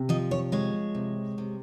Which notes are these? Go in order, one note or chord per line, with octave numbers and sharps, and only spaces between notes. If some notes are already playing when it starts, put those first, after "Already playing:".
Already playing: C3
F3 D#5
C#5
G#3 C#5
C3
C3